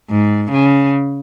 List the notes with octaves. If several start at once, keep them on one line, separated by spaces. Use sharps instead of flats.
G#2
C#3